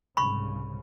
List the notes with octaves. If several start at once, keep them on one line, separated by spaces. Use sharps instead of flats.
C2 G#2 C#3 B5 C#6